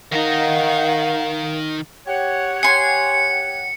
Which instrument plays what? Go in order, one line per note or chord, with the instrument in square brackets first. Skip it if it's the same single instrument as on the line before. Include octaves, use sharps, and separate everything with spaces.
[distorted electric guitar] D#3 A#5 [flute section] D#4 F#5 [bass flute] A#4 [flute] F5
[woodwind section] G4 C#5 F#5
[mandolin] G#5 C6 [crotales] C#7